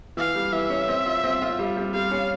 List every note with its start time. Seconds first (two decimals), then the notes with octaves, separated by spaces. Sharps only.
0.17 E3 F5
0.35 G3
0.53 E3 E5
0.70 C#4
0.88 C4
1.06 F4
1.24 C4
1.42 F4
1.59 G3
1.77 G3
1.94 G3 F5
2.11 C#4